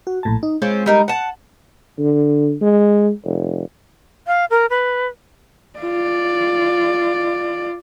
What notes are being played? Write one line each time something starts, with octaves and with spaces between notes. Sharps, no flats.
F#4
A#1 A2 A5
D#4
G#3 C4 C#4 F4
G3 D#4 A#4
F#5 A5
D3
G#3
F1
F5
A#4
B4
F4 D5